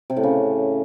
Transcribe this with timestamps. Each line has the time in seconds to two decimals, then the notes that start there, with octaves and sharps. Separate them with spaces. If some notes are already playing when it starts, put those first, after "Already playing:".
0.10 C3
0.17 A2
0.23 C#3